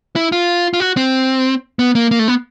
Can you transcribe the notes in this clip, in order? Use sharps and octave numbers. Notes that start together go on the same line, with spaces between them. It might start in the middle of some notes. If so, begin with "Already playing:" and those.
E4
F4
F4
F#4
C4
B3
A#3
A#3
A3
B3